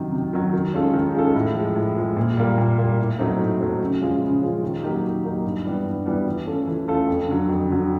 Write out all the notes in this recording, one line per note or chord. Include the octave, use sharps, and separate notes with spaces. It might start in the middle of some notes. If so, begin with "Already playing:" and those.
Already playing: C3 D#3 F#3
C3
D#3 F#3
D#3
G#3 C#4 F4 A4
D#3
G#3 C#4 F4 A4
A2
F3 G#3
A2
F3 G#3
A#2
G3 A#3
A#2
G3 A#3
A2
F#3 A3 C4 D#4
A2
F#3 A3 C4 D#4
C#3
F3 G#3 C#4 F4
C#3
F3 G#3 C#4 F4
D#3
F#3 A#3 D#4 G4
D#3
F#3 A#3 D#4 G4
G2
E3 G3 B3
G2
E3 G3 B3
E3
A3 C#4 F4 A4
E3
A3 C#4 F4 A4
F2
D3 F#3
F2
D3 F#3